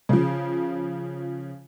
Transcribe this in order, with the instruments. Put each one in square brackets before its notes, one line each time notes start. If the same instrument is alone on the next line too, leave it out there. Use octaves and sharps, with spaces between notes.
[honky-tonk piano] C#3 F3